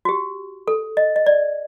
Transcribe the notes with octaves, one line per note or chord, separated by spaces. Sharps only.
F#4
G4
A4
D#5
D#5
D5